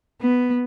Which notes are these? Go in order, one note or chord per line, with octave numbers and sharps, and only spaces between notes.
B3